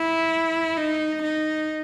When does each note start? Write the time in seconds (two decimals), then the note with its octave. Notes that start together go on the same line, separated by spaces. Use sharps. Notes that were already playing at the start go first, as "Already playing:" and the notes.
Already playing: E4
0.77 D#4
1.23 D#4